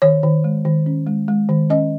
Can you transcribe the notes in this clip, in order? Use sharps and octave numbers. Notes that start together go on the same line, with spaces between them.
D#3 C#5
D#3
G#3
D#3
C#4
G#3
G#3
D#3
C#4 D#5